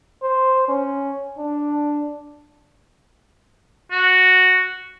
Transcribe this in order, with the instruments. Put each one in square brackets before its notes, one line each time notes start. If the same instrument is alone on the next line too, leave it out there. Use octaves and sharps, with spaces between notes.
[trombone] C5
C#4
D4
[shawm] F#4